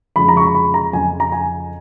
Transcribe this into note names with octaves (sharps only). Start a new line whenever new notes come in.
F2 C#3 F3 G#3 B5
A#5
C#6
B5
B5
A#5
F2 C#3 F3 G#5
A#5
G#5